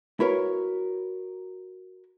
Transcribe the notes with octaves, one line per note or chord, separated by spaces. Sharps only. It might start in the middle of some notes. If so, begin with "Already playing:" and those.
E4 F#4 A#4 B4 C#5